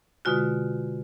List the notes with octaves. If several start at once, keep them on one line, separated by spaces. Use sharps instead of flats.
B2 D3 G#3 F4 F#4